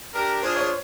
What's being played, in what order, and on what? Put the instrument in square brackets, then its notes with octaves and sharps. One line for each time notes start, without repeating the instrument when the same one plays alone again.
[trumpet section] D4 G4 A#4
[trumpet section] D4 F4 G#4 [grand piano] C5
[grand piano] C#5